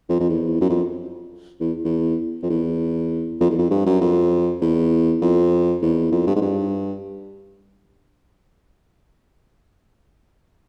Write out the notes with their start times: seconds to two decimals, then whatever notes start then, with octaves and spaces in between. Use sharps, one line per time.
0.09 F2
0.20 F2
0.29 E2
0.61 F#2
0.69 F2
1.60 E2
1.84 E2
2.43 F2
2.50 E2
3.40 F2
3.50 E2
3.58 F2
3.71 G2
3.86 F#2
4.01 F2
4.61 E2
5.21 F2
5.81 E2
6.12 F2
6.27 G2
6.35 G#2
6.42 G2